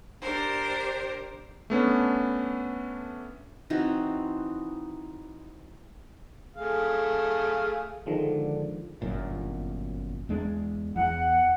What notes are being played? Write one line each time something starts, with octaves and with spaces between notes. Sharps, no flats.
D4 G4 A#4 C5
A3 B3 C#4 D4
E3 C4 D#4 F#4
A3 G#4 F5
D3 D#3 F3 G#3
G1 F#2 A#2
E2 G#3 D4
E2 F#5